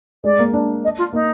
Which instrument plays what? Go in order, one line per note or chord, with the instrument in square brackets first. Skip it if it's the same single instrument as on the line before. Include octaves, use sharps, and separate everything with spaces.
[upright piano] G#3 [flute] D5
[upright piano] A#3
D4
[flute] D#5
F4
[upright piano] A#3 [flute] D#4